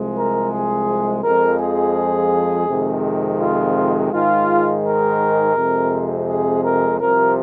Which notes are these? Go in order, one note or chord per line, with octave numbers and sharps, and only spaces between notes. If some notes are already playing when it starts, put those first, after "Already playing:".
Already playing: C2 C3 F3 G#3
A#4
G#4
F2 F3 G#3 A#4
G#4
F2 C3 D#3 G#3
F4
G#2 D#3 G#3 F4
A#4
F2 C3 G#3
G#4
A#4
C2 C3 F3 A#4